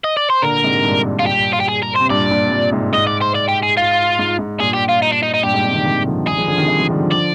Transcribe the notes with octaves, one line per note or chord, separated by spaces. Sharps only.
D#5
D5
C5
A#2 D3 A#4
G#2 C3
G2 A#2
F4
G4
F4
G4
G#4
A#4
C3 C5
G2 A#2 D5
G2 A#2
C3
G2 A#2
G#2 C3
G#2 D#5
D5
C5
D5
G4
G#4
F4
G#2
G#2
G2 A#2 G#4
G4
F4
D#4
D4
D#4
D#4
G2 A#2 G4
G#2
G#2 C3
C3 D#3
C3 D#3
D3 F3
D#3 G3 G#4
F3 G#3
D3 F3
C3 D#3
D#3 G3
F3 G#3
D#3 G3
D3 F3
D5